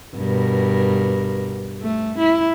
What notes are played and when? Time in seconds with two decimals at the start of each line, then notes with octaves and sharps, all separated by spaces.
0.17 G2 B2 A#4
1.81 A3
2.18 E4